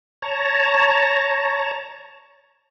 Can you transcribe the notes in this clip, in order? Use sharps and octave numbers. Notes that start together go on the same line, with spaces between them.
C#5 A5 A#5